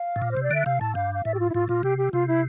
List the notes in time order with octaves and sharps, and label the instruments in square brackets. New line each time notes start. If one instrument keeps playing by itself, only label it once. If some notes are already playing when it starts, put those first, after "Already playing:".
Already playing: [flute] F5
[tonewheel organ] A2
A#2
[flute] C5
[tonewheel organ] C3
[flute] D5
[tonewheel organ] D3 [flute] E5
[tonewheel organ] C3 [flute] F5
[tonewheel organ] A2 [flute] A5
[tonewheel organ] G2 [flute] F5
[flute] F5
[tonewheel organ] A2 [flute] E5
[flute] G4
F4
E4
[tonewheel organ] A2 [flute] F4
[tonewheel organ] A#2 [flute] F4
[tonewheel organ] C3 [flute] G4
[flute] G4
[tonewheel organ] C3 [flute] F4
[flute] E4